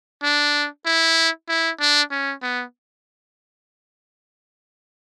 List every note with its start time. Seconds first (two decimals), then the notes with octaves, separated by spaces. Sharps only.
0.23 D4
0.86 E4
1.49 E4
1.80 D4
2.12 C#4
2.43 B3